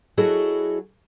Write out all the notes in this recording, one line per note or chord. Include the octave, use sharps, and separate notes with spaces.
F#3 E4 F#4 G#4 A4 D#5